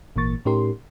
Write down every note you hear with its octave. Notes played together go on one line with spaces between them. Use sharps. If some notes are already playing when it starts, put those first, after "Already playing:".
G#1 A#2 E3 A#3 C#6 A6
A2 C#4 D#4 G4 A#4 C6